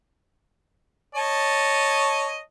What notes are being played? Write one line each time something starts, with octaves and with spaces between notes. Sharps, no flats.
C#5 D#5 A5